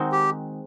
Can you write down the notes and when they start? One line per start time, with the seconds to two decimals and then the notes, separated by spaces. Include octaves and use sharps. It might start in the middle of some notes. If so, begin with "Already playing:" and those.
Already playing: D#3 G#3 C4 D#4 F#4
0.12 G4